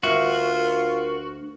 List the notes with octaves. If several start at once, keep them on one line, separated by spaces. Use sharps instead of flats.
D2 F4 F#4 A#4 E5